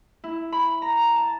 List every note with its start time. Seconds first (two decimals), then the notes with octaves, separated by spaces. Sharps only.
0.24 E4
0.52 B5
0.82 A#5
1.15 A5